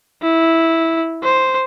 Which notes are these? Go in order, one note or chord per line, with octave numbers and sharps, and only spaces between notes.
E4
C5